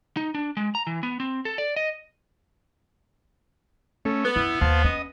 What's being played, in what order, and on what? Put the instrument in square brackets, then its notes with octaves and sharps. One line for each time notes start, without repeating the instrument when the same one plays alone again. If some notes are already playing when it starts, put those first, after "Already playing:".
[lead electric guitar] D#4
D4
G#3
A#5
E3
B3
C4
A4
D5
D#5
[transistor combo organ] A3 C#4
[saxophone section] B3
[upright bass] F#2 [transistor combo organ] E4
[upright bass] D#2 A3 [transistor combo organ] C5 F5 A5
[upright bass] C#4 [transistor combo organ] D#5